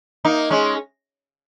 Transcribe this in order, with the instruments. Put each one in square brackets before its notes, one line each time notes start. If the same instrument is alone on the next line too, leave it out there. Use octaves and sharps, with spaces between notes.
[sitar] A#3 D#4
G#3 C#4